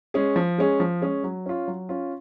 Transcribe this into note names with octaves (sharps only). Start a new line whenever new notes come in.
G#3 C#4 G#4
F3
G#3 C#4 G#4
F3
G#3 C#4 G#4
F#3
C#4 F4
F#3
C#4 F4